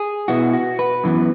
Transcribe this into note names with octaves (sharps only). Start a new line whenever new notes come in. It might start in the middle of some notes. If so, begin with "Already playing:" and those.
Already playing: G#4
B2 B3 E4 F#4
F#4
B4
F#2 E3 B3